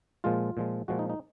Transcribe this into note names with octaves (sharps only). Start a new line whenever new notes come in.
A#2 F3 G#3 F4
A#2 F3 G#3
A#2 F3 G#3 F#4
D#4
D#4